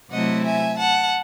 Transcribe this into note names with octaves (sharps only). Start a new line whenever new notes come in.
C3 F#3 A3 C4 E4 D#5 F#5
E5 G#5
F#5 A5